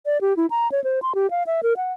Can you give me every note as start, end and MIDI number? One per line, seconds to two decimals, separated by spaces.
0.06 0.21 74
0.21 0.36 67
0.37 0.46 64
0.50 0.70 82
0.72 0.82 73
0.84 0.99 72
1.02 1.13 84
1.15 1.30 67
1.31 1.43 77
1.47 1.61 76
1.63 1.74 70
1.77 1.93 78